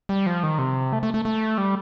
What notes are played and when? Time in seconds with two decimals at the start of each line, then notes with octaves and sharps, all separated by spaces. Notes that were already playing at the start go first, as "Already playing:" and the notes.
0.09 G3
0.26 F3
0.43 D#3
0.58 C3
0.93 A3
1.03 A3
1.14 A3
1.25 A3
1.58 G3